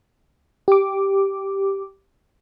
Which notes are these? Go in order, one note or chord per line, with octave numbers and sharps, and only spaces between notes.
G4 D6